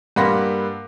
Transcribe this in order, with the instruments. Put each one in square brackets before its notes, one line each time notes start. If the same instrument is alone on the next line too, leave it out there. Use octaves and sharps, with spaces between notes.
[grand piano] G2 A#3 F#5 B5 C6 A#6